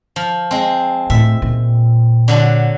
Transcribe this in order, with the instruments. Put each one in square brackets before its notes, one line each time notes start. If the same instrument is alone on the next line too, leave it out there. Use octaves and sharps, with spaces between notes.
[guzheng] F3
G#3 C4
[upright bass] A2 [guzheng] E5
[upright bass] A#2
[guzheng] D3 F#3 D4